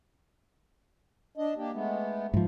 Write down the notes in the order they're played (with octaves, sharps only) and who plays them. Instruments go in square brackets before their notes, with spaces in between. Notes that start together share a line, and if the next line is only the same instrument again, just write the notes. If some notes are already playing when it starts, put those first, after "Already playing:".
[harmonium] D4 D#5
A#3 D4 G4
G#3 A3 B3
[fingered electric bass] G#2 F3